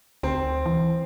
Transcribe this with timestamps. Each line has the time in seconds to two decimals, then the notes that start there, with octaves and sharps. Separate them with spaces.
0.23 D2 C4
0.66 E3